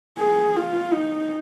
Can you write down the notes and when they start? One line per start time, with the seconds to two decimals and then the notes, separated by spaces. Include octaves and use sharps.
0.19 G#4
0.56 F4
0.93 D#4